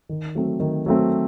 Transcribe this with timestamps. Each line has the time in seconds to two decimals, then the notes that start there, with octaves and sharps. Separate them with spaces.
0.09 D#3
0.35 F#3 A3 C4
0.60 D#3
0.86 F#3 A3 C4